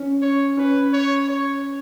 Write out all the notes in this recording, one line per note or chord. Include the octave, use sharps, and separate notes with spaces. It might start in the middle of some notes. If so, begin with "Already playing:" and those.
Already playing: C#4
C#5
C#4 B4
C#5
C#5